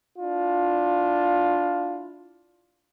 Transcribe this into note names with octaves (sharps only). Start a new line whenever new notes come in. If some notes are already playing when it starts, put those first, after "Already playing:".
D4 E4 F4